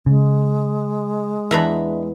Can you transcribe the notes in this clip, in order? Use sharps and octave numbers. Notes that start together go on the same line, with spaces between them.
C#3 G#3
E2 D4 B4 E5 A#5 B5